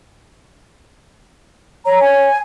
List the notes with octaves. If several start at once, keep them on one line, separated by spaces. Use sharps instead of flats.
C#5 A#5
G#5